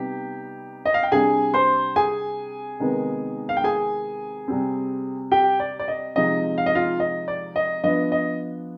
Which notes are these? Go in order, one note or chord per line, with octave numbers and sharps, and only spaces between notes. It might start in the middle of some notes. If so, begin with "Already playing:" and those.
Already playing: C3 G3 B3 D#4 G4
D#5
F5
G5
C3 G3 D4 G#4 G#5
C5 C6
G#4 G#5
C3 D#3 G#3 B3 D#4
F5
G5
G#4 G#5
C3 G3 C4
G4 G5
D5
D5
D#5
C3 F3 G#3 C4 D#4 D#5
F5
D#5
F4 F5
D#5
D5
D#5
F3 B3 D4 D#5
D#5